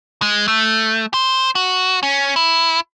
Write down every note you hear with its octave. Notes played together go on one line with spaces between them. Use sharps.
G#3
A3
C5
F#4
C#4
E4